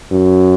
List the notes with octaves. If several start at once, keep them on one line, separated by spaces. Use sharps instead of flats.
F#2